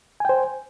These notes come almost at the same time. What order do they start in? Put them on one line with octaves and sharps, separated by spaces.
G#5 G5 C5